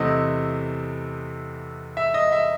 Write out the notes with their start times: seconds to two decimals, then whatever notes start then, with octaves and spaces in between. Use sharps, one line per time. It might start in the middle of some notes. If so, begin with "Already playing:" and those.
Already playing: E2 C3 E3 A3 C4 D#5
1.97 E5
2.14 D#5
2.32 E5